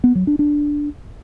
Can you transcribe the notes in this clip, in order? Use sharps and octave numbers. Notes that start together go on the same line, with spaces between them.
B3
F#3
D4
D4